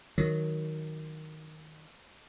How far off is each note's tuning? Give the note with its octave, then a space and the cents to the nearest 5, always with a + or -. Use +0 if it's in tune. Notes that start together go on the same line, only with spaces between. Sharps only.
D#3 +0 F#3 +0